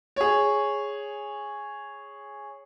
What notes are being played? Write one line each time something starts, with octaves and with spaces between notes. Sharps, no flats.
G#4 C#5